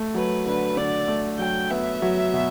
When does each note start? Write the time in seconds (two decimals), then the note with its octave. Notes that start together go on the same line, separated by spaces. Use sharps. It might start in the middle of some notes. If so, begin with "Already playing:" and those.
Already playing: A3
0.15 F#3 B4
0.46 D3 B4
0.77 D3 D5
1.08 A3
1.39 F#3 G5
1.70 B3 E5
2.02 F#3
2.33 B2